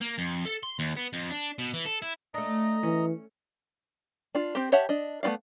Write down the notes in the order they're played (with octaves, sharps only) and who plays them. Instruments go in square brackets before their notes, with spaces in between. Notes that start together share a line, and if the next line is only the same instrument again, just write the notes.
[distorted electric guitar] A#3
F2
A4
C6
D#2
B3
F2
D4
B2
E3
A4
E4
[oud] A3 D4 [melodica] D#5 A#5
[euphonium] E3 [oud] C#4
[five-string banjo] D4 F4
C4 G4
G4 C#5 E5 F#5 A5
D4 D#5
A3 B3 F4 D5 F5